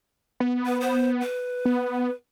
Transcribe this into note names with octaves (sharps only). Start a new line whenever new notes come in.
B3
B4
C5
B4
B3